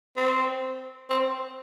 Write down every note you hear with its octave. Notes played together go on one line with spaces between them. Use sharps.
C4
C4